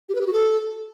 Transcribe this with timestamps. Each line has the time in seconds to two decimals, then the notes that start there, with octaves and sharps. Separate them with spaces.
0.09 G4
0.15 B4
0.21 G4
0.27 F#4
0.33 A4